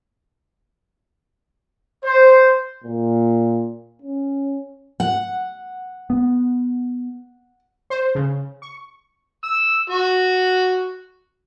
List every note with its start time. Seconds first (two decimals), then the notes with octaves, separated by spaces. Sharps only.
2.04 C5
2.84 A#2
4.02 C#4
5.00 F#5
6.10 B3
7.90 C5
8.15 C#3
8.62 C#6
9.44 E6
9.90 F#4